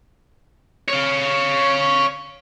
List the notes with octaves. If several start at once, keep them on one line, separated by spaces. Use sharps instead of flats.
C#5 F5